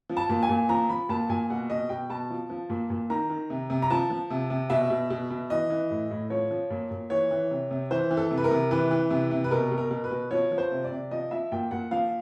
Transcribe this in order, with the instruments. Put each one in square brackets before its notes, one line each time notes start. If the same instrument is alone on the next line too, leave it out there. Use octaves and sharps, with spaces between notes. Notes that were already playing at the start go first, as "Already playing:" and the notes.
[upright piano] F3
A5
A#2
G#5
A#2
F3 A#5
F3 B5
A#2 A5
A#2 G#5
B2 F#5
B2 D#5
B2 G5
B2 A5
F3
F3
A#2
A#2
D#3 A#5
D#3
C3
C3
A#5
F3 A5
F3
C3
C3
B2 E5
B2
B2
B2
E3 D#5
E3
A2
A2
F3 C#5
F3
A#2
A#2
E3 C#5
E3
C3
C3
E3 C5
E3
A4
C3
B4
A#4
C3
E3 B4
E3
C3
C3
B4
B2 A#4
B2
A#4
B2
B4
B2
F3 C#5
F3
C5
C3
D5
C3
F3 D#5
F3 E5
A#2 G5
A#2 F#5
F3 F5